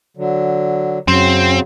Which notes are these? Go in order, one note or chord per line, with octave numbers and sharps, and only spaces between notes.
D3 F#3
F#2 C#3 F#3 C4